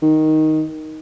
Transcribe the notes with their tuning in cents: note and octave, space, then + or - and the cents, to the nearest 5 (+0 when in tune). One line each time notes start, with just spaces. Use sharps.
D#3 +5